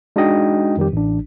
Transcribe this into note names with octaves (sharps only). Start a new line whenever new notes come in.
G#3 D4 D#4 F#4 D#5 G5
F2 D#3 G3 G4
A1 D4